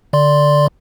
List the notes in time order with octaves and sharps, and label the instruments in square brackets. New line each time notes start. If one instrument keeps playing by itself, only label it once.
[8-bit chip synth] D3 D5 C6